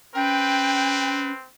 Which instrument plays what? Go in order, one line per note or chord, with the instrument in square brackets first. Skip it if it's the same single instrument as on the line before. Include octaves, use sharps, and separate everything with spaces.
[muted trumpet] C4 [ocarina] C#4 [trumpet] B4 [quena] G5